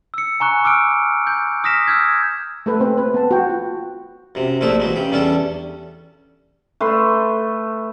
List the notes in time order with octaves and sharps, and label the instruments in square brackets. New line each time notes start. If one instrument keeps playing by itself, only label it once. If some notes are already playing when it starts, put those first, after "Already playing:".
[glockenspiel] E6 C#7
G#5 A#5 C#6 F#6
D6 E6 F6 D7
G6
D#6 F6 A#6 B6 E7
E6 F6 G6 G#6
[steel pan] A3 A4 B4
A#3 C4 C5
B4
B3 A5
F#4 G5
F4
[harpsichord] F#2 C3
A#1 A#2 F3 A3 E4 D#6
E3 F#3 G#3
C#3 G4
E2 G3 C#4 D4 A4
[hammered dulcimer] A3 B4 C6